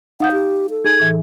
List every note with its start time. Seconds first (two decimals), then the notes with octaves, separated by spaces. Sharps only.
0.20 D#4 F5 F#5 D#6 G6
0.32 G4
0.70 A4
0.85 D#4 G#4 G#6
1.00 A2 E3